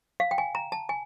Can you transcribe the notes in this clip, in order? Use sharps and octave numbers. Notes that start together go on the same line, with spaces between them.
F5
G5
G#5
A#5
A5
G#5